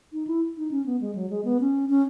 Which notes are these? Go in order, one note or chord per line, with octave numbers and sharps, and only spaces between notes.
D#4
E4
D#4
C#4
B3
G#3
F#3
G#3
B3
C#4
C#4